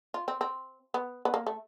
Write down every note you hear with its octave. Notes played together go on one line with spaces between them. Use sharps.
F4
C4
C4
B3
B3
A#3
A3